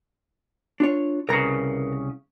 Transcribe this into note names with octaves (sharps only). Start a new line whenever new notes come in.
D4 F4 C#5
C2 C#3 A#4 B4 A#5